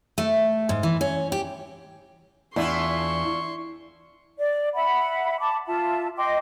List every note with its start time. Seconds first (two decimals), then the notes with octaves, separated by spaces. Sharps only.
0.18 A3
0.69 G#2
0.83 E3
1.01 C#4
1.32 G4
2.56 E2 D4 E4 F4 C6 C#6
4.39 D5
4.75 E5 F#5 B5
5.39 A5 B5 D6
5.67 F4 E5 A5
6.17 D#5 G5 C6 D6